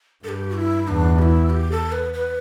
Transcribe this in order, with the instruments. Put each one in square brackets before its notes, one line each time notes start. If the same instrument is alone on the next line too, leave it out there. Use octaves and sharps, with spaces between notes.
[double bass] G2 [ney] A4
[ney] G4
E4
[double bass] E2 [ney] D4
[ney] G4
E4
G4
A4
B4
B4